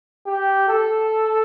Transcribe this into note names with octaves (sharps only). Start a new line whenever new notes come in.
G4
A4